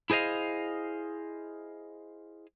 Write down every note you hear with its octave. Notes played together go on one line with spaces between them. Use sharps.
E4 G#4 C5 D#5 F5